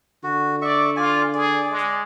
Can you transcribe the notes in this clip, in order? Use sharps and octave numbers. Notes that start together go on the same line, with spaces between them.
D3 F#4
D5 E5 C#6
F4 D5 G#5
G#4 D5
G#3